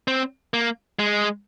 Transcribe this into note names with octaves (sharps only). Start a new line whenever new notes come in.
C4
A#3
G#3